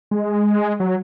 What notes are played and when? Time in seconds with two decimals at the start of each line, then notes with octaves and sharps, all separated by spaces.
0.11 G#3
0.80 F#3